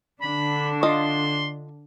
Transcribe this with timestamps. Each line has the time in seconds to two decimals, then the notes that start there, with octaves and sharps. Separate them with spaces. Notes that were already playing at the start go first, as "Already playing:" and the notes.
0.22 D3 D4 B5
0.83 F4 D#5 F5 C6